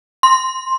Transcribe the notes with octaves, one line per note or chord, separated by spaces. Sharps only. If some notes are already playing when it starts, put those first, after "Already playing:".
C6